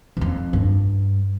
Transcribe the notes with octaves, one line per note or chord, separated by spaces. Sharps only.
G2
F2
G2